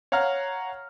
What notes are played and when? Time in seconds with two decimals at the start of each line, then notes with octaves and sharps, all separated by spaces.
0.12 C#5 F5 F#5 A#5 F6